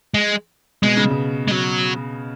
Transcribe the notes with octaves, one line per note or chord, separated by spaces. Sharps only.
G#3
B2 G#3
C#3
B2
G#3
F#3